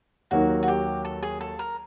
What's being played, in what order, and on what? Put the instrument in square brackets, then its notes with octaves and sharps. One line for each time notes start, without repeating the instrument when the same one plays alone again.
[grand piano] D#2 D#3 F#3 A#3 [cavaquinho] F#4
[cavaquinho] F#4
G4
A4
G#4
A4
A#4